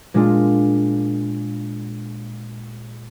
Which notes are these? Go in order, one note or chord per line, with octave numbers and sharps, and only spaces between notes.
A#2 G#3 D4 F4